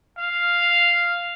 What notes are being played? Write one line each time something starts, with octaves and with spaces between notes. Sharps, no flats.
F5